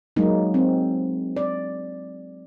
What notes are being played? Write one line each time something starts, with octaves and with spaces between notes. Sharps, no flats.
F#3 G#3 A#3 D#4
C4
D5